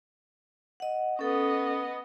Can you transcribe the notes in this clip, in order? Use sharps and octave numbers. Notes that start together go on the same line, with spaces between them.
D#5 F#5
B3 C#4 A4 D#5